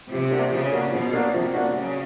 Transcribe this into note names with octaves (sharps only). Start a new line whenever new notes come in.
C3 F3
A#3 D4 F#4
C#3 F3
A#3 D4 F#4
B2 F3
A#3 D4 F#4
C3 F3
A#3 D4 F#4
C#3 F#3